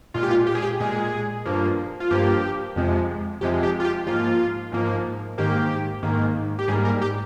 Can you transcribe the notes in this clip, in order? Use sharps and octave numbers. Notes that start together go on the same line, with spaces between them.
A#2 G#3 F4
G4
F4
G4
G#4
G4
A#2 G#3 G#4
G2 F3 A#3
F4
G2 F3 A#3 G4
F2 C3 F3 G#3
F2 C3 F3 G#3 G4
G4
F4
G4
G#2 F3 A#3 F4
G#2 F3 A#3
G#2 D#3 A#3 G4
G#2 D#3 A#3
G4
G#2 G3 A#3 G#4
A#4
G4